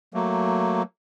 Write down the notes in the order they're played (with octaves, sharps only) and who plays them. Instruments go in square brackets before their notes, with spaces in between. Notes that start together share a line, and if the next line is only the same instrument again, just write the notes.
[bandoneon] F#3 A3 A#3